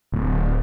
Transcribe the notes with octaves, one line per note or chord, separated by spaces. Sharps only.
D1